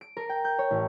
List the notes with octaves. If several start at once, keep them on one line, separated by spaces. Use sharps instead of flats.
D7
A#4
G5
G6
C#5
A1